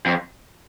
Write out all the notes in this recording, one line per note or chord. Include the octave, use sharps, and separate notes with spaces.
F2